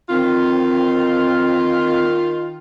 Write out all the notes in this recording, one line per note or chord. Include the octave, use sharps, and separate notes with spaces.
D#3 C4 F4